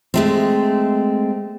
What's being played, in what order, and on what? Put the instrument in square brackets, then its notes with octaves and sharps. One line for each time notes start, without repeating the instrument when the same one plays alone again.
[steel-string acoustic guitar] G#3 A3 C4